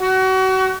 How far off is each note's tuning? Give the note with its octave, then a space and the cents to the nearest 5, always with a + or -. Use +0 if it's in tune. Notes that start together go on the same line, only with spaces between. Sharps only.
F#4 +30